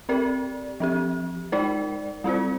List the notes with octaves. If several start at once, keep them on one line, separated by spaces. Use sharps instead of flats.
C4 G4 A#4 D5
F3 C4 G4
G#3 D#4 A#4 D5
G3 C4 F4 C5